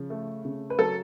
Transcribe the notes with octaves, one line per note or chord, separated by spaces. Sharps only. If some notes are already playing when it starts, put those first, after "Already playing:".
Already playing: C#3 F3
A3
C#3
B4
F#3 A4